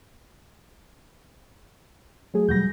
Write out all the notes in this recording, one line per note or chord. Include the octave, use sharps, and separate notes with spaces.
F#3 A3 G#4
E1 F#3 G3 G6 A#6